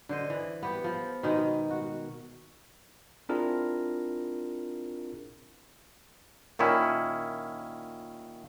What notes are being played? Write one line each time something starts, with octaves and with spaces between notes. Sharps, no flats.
D3 C5 D#5
E3
B3 G4
F3
B2 D#3 G#3 D#4
F#4
C4 D4 E4 F4 G#4 A#4
A#2 D#3 C#4 E4